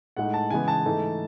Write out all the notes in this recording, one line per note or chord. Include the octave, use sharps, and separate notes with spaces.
A2 G#3 D#4 F#5
A5
C#3 E3 G#3 B3 G#5
A5
G#2 E3 A3 D#4